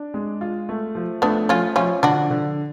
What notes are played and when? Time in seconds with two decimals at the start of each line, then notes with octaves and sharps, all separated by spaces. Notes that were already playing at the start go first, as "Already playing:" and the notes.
Already playing: D4
0.14 G#3
0.41 F4
0.69 A3
0.95 F3
1.22 A3 B3 D4
1.49 F3 C#4 F4
1.76 F3 C#4 F4
2.03 D3 D4 F#4
2.30 D3